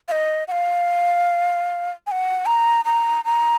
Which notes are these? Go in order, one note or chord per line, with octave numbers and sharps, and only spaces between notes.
F5
D#5
F#5
F5
G#5
F#5
A#5
A#5
A#5